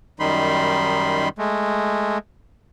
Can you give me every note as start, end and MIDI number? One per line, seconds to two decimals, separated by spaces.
0.20 1.29 42
0.20 1.29 51
0.20 1.29 55
0.20 1.29 63
0.20 1.29 83
0.20 1.29 84
1.38 2.18 56
1.38 2.18 57